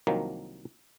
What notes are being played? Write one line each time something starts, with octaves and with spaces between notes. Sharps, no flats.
C2 D#3 F3 F#3 A#3